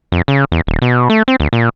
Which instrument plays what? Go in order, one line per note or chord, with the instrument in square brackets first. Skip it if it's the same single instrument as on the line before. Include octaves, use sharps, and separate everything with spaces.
[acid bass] F2
C#3
E2
D#1
B2
A3
C4
D2
A#2